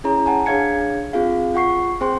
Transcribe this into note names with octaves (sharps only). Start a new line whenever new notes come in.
C#4 E4 G#4 C#5 A#5
F#5 G#5 A5
D4 G#4 C#5 F5 G#6 C#7
C4 F4 G#4 F5
F4 F#5 C#6 C7
C4 G#4 C5 G5 C6